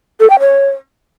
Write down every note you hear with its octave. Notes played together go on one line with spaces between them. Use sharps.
A4
G5
C#5